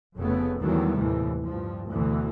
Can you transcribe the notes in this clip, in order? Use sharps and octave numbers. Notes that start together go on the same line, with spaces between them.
F1 F2 C#3 A3 B3
E2 D#3 E3 F#3 G3 A3
D#2 A2 C3 E3
G2 F3
D2 B2 E3